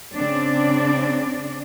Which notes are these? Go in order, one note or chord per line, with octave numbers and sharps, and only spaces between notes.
C#3 C4 D4 D5